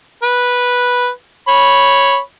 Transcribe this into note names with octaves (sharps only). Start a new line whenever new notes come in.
B4
C#5 B5